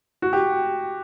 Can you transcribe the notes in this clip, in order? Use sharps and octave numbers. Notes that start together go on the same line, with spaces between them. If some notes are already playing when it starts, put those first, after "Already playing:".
F#4
G4